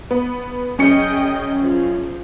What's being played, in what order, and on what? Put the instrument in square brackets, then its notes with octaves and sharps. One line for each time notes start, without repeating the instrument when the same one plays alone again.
[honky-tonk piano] B3
[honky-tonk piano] F#2 C#4 C#7 [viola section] G#4 D#5 G5
[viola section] F3 G#4